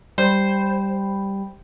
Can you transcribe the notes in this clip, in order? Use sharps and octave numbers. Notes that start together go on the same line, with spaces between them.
G3 C5 G5 B5